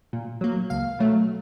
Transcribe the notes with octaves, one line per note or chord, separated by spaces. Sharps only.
A#2
F#3 A#3
C#2 F5
B2 F#3 A3